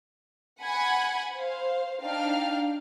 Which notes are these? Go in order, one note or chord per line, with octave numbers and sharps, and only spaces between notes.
F#5 G#5 B5 G#6
C5 F5
D4 D#4 F5 G5 F6